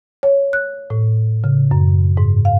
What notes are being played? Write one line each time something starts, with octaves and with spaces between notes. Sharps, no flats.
C#5
F#6
A2
C#3
F#2
G#2
F5